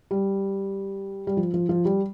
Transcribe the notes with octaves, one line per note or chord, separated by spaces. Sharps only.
G3
G3
F3
F3
F3
G3